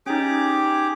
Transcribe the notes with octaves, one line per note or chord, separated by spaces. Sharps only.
C#4 D#4 G4 G#4 D6